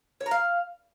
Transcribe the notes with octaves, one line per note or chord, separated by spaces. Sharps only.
C#5
A#5
F5